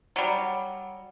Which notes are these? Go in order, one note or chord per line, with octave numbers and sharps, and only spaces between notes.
F#3 G3